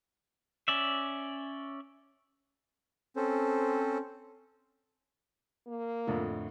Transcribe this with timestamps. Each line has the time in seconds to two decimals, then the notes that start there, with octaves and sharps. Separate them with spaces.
0.68 C#4 D5 E5
3.16 C4 C#4 A4 C5
5.67 A#3
6.07 F2 A2 D3